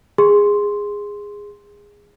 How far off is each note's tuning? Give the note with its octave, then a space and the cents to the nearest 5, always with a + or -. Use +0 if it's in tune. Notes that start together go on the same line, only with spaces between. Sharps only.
G#4 -15 C6 +0